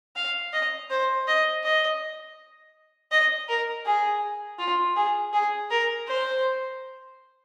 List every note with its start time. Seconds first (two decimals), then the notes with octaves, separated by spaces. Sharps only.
0.16 F5
0.53 D#5
0.90 C5
1.27 D#5
1.64 D#5
3.11 D#5
3.48 A#4
3.85 G#4
4.59 F4
4.96 G#4
5.33 G#4
5.70 A#4
6.07 C5